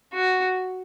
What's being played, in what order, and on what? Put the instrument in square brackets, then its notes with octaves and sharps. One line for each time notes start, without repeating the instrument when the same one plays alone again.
[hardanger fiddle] F#4